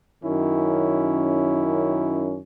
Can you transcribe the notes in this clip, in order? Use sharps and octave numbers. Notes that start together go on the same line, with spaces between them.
F#2 D#3 C#4 E4